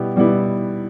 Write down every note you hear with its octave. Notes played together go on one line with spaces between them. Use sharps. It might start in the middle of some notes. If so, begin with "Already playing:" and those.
Already playing: B2 G3 B3 E4 G4
B2 G3 B3 E4 G4